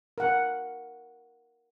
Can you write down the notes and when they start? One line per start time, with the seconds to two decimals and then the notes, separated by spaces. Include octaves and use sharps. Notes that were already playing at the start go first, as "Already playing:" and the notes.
0.18 A#4 F#5